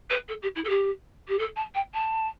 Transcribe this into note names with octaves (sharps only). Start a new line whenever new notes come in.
B4
A4
G4
E4
A4
G4
G4
A4
A5
G5
A5